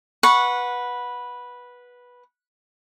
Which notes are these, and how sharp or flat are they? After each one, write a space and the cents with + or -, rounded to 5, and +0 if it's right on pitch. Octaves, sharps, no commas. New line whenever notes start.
B4 -10 F#5 -15 C#6 +0